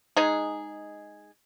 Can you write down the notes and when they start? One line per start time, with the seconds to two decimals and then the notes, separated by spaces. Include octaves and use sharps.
0.16 G#3 D#4 G#4